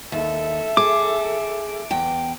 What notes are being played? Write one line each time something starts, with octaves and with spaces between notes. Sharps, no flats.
D#2 A4 E5
G#4 D6
E2 G5